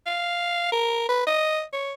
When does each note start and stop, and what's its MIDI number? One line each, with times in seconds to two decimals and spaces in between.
0.06 0.69 77
0.72 1.06 70
1.09 1.26 71
1.27 1.63 75
1.73 1.93 73